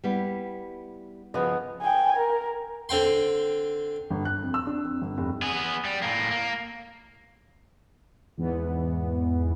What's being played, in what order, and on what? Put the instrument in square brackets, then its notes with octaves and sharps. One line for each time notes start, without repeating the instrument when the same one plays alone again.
[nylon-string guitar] G3 B3 E4
[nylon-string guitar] C#3 F3 [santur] B3 D#5
[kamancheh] G5 G#5
A#4
[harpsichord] D3 C4 G5 C6
[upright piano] G1
F#6
F2
E6
D4
F2
G1
F1
[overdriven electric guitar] B3 G#4
G3
A2 A#3
A#3
[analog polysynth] E2 G#2 E3 B3